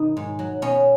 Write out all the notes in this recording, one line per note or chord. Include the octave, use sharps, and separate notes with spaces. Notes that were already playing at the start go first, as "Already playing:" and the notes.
Already playing: B2 D#3 D#4
G#2
F#3
B2 C#4